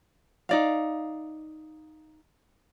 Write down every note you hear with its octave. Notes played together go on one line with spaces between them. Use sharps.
D#4 D5 F5